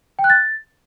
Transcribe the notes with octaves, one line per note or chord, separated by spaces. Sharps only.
G5
F#6
A6